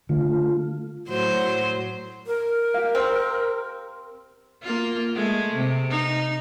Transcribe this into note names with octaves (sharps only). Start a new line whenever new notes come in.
D3 A3 F4
A2 F#3 C5
A#4
G4 F5
C4
A#3 F4
G#3 A3
C3
D#4